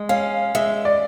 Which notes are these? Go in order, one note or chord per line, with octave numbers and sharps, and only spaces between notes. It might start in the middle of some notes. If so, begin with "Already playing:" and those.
Already playing: G#3
C#4 F5
G#3 E5
D5